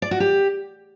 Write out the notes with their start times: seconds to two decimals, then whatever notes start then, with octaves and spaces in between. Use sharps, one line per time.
0.02 D5
0.11 F#4
0.20 G4